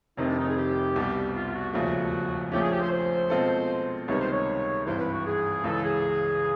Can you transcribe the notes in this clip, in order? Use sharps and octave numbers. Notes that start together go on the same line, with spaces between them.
F1 F2 C3 D#3 D#4
D4
D#4
G#4
G4
C2 B2 G3
F4
F4
F#4
E1 D#2 C#3 F3 A3
A#1 A#2 F3 A3 C#4 G4
G#4
G4
C5
C5
B2 G#3 C4 F4 A4
C#2 C3 D#3 G3 B3 C#5
C5
C#5
G#1 G2 E3 C5
B4
F#4
G#4
C#2 C#3 E3 A4
G#4